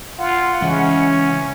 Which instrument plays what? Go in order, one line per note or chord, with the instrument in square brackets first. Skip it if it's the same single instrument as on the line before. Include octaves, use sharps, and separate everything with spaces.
[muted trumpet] F4 [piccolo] F#5
[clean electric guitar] C#3 [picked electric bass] E3 G#3 [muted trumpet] C#4